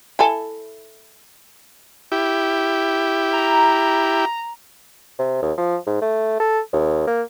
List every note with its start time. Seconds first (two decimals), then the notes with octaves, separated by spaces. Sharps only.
0.19 E4 A4 G#5
2.12 E4 G4
3.33 A#5
5.19 C3
5.42 D#2
5.58 F3
5.87 G#2
6.02 A3
6.40 A4
6.73 D#2
7.07 A#3